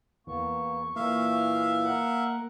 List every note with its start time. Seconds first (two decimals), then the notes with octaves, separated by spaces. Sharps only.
0.27 E2 A#3 B3 C#6
0.96 A#2 E3 A#3 E4 E5 F5
1.84 A#4 F#5